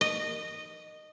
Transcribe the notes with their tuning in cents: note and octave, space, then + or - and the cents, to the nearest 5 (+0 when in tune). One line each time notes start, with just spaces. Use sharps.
D#5 -15